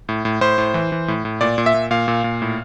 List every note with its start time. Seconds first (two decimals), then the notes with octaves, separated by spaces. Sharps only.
0.09 A2
0.25 A2
0.41 A2 C5
0.58 A2
0.74 E3
0.92 E3
1.08 A2
1.25 A2
1.41 A#2 D5
1.58 A#2
1.66 E5
1.74 A#2
1.91 A#2 F5
2.08 A#2
2.24 A#2
2.42 A2